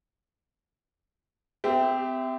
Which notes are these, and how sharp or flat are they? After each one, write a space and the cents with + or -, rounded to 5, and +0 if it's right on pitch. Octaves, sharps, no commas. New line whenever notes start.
C4 -35 G4 +0 E5 +0